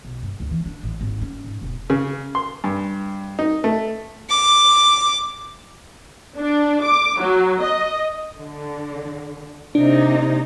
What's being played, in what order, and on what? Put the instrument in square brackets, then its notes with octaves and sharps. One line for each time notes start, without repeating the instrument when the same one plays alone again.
[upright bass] B1
G2
C#2
E3
D4
A1
G#1
C#4
G#2
E1
[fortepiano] C#3
C6
G2
D#4
A3
[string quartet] D6
[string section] D4
D6
F#3
D#5
[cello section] D3
[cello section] C3 A#3 D#4 [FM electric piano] D4